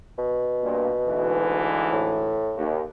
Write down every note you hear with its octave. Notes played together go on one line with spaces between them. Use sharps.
B2
G2 A#2
D2 G#2 E3
A2
D#2